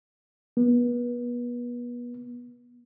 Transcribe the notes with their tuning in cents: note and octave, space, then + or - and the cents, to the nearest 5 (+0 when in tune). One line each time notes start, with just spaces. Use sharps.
B3 -35